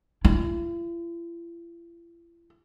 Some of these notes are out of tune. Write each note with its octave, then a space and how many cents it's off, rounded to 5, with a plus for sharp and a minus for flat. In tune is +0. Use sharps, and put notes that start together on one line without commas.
E4 +45